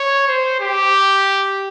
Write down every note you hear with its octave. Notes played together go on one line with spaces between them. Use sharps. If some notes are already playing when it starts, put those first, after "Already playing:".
Already playing: C#5
C5
G4